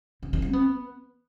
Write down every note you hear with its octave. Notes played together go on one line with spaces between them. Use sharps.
D3
D#3
F3
C4
B3